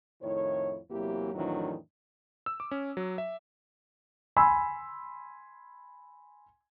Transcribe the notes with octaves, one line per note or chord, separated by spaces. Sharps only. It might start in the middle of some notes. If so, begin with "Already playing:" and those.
F2 A2 D#3 E4 C#5
E2 C3 E3 F#3 A#3 G4
F2 A2 D#3 E3 F#3 D4
E6
D6
C#4
F#3
E5
G#5 B5 C6 E6